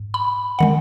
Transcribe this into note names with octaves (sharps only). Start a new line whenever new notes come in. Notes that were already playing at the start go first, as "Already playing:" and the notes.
Already playing: G#2
B5
D#3 G#3 F#5